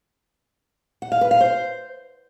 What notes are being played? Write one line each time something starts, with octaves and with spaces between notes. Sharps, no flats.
F#5
F5
B4
F5
C5